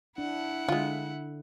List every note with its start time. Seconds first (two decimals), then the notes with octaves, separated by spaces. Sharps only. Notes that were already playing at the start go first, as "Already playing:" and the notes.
0.18 D4 E4 F#5
0.69 D3 G#3 F4